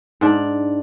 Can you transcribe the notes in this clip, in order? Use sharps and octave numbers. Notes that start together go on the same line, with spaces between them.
G#2 D4